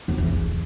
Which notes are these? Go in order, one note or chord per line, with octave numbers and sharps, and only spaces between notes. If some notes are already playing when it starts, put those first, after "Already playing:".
F2
E3
E2